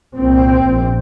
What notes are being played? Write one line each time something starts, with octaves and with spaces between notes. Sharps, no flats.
C2 A#2 C4
A#1 A#2